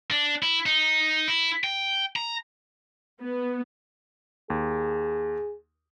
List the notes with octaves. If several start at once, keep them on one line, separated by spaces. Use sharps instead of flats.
D4
E4
D#4
E4
G5
A#5
B3
D#2 G#4